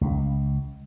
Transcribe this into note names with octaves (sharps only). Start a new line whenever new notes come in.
C#2